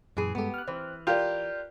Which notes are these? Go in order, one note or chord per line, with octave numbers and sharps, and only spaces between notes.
F#2 A#2 E3 G#4
G2 G#3 B3 G4 A4
F6 F#6
E3 C4
F4 G4 A#4 D5 G6